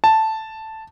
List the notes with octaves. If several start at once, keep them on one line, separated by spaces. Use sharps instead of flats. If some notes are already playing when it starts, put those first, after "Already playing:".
A5